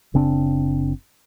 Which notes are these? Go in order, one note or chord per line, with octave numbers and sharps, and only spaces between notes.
F#1 C#3 C4 D4